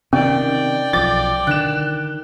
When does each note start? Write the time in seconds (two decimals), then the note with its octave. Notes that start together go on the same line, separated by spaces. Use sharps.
0.13 C3 D#3 C#4 D5 G5
0.93 B1 F3 D6 A6
1.47 D3 D#3 F#6 E7